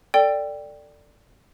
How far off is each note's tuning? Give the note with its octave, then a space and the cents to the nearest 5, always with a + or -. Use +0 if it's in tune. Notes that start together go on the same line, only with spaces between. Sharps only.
A4 +25 D5 +0 G5 +0